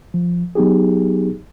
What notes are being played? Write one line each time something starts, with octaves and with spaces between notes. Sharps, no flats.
F3
F#3 B3 D#4 G4 G#4